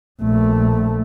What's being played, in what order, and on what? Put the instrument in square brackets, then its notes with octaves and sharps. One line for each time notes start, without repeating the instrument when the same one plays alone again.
[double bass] A#1 A3